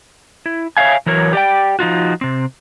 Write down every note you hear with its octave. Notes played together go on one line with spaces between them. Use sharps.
E4
C#5 D5 E5 F5 G#5
E3 F#3 A#4 C#5
G4 D5 G5
F3 D#4 F4 F#4
C3 C4